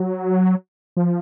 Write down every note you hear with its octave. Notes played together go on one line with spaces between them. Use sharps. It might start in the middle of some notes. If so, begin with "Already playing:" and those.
Already playing: F#3
F3